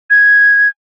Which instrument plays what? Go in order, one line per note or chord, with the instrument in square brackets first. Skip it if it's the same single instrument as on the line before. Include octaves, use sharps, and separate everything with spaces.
[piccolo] G#6